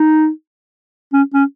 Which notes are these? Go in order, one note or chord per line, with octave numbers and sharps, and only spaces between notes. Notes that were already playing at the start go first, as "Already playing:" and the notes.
Already playing: D#4
C#4
C#4